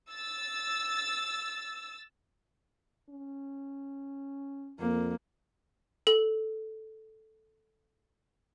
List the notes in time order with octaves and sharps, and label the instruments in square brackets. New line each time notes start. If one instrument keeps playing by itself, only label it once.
[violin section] E6 A6
[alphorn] C#4
[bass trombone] F2 [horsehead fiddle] A#3
[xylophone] A4 F#7